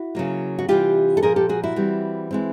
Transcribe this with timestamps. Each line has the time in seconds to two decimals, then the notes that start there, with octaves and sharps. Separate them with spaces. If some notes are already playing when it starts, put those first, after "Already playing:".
Already playing: E4 F#4
0.15 C#3 F#3 A#3
0.59 F#4
0.69 C3 E3 G3 F4 G4
1.17 A4
1.23 A#2 F3 A#3 G#4 A#4
1.36 G4 A4
1.49 F#4 G#4
1.63 E4 F#4
1.76 E3 G3 C4
2.31 E3 G#3 C4